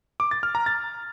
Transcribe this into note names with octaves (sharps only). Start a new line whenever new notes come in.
D6
A6
F6
A#5
A6